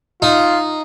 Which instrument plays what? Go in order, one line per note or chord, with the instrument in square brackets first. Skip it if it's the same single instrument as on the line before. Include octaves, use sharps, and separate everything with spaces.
[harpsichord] D#4 [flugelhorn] F4